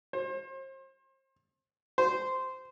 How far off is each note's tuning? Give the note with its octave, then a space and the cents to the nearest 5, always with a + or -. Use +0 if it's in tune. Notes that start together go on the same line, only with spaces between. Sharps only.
C5 +35
C5 -10